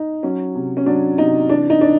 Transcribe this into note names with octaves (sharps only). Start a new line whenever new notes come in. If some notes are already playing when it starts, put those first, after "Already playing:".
Already playing: D#4
F#3 C#4
C3
C#4
F#3 D4
C3 D#4
E3 D4
D#4
E3 D4